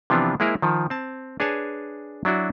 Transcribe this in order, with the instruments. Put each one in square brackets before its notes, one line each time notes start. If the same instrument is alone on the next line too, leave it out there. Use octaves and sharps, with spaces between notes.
[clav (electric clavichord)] C3 E3 F3 B3 D4 F4
G#3 A#3 E4 G#4 A#4 C5
D#3 F3
C4 A5
D4 G#4 B4 C#5 G#5 A5
F#3 D4 E4 F#4